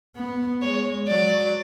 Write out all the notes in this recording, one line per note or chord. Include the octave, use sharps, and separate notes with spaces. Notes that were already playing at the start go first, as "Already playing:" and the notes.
B3
G#3 C#5
F#3 D5